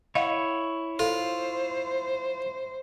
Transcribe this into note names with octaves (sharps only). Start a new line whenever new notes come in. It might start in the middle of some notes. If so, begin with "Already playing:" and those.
E4 C#5 D#5 F5 F#5
F4 A4 C5